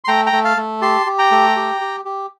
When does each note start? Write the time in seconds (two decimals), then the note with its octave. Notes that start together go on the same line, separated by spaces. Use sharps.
0.04 C6
0.08 A3 G5 A#5
0.26 G5 A#5
0.33 A3
0.45 F5 A5
0.57 A3
0.81 G4 A5 C6
1.06 G4
1.18 G5 A#5
1.31 A3
1.56 G4
1.81 G4
2.05 G4